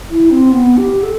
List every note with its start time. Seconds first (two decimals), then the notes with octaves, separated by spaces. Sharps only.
0.11 E4
0.30 C4
0.51 B3
0.77 G4
1.03 A4